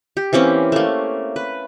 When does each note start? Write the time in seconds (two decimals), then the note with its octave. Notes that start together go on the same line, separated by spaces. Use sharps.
0.17 G4
0.33 E3 A#3 C4 C#4
0.72 A3 A#3
1.36 B4